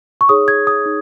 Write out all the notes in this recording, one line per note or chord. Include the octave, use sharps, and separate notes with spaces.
C#6
D#4 G#4 C#5 D#6
G#6
D#6
D#4